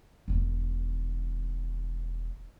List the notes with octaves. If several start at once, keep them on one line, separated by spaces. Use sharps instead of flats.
E1 D#3